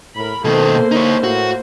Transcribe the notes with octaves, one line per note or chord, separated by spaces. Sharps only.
A2 A#4 B5
B2 D#3 A#3 E4 A4 C5
D3 D#4 C#5
A2 F#4